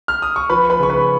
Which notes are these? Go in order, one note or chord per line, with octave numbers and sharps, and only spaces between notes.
F6
D#6
C#6
F3 B4 B5
B4 B5
C#3 C#6
B4 B5